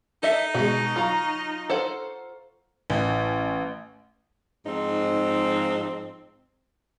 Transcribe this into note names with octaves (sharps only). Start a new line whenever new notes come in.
D#4 A4 D#5 E5
B2 G#3 F#4
F#3 F4 A#5 C#6
A4 C5 F#5
A1
G#2 F3 C4 D#4